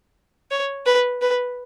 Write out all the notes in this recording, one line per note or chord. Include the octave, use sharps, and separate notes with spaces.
C#5
B4
B4